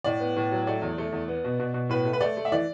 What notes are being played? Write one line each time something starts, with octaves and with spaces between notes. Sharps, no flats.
A2 D5
B3
A2
F#3
A3 D5
E2
A3
E2
B3
B2
B2
B2
A2 B4
A3
B4
A3 D5
A3
E5
E3 D5